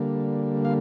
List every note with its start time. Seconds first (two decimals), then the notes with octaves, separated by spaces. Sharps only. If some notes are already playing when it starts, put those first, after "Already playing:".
Already playing: D3 G3 A#3
0.65 F5